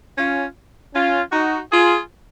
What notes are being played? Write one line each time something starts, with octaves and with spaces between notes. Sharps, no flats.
C#4 F4
C#4 F4
D#4 F#4
F4 G#4